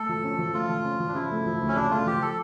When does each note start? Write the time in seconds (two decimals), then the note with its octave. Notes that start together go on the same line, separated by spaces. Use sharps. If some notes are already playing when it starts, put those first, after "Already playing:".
Already playing: A3 A4
0.09 F3
0.24 C#4
0.39 F3
0.54 A3 F4
0.70 F3
0.85 C#4
1.00 F3
1.08 D4
1.15 C#3 E4
1.31 A3
1.46 F3
1.61 D2
1.68 C#4
1.76 C#3 D4
1.91 A3 F4
2.06 F3 G4
2.22 A4